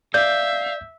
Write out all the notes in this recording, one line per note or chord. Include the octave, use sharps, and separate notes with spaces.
D5 E5 F5 G6